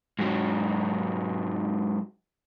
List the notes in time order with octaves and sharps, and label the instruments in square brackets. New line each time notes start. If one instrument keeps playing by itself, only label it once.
[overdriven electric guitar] G#2 F#3